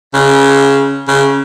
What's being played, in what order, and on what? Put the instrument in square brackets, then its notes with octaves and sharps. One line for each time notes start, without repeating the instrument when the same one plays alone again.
[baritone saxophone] C#3
C#3